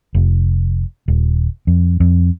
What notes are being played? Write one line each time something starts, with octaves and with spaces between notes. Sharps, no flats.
F1
D#1
F2
F2